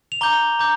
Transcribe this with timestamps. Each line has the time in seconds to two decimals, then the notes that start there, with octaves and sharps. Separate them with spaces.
0.12 F7
0.21 A#5 D6 G6 G7
0.59 A#5 D6 G6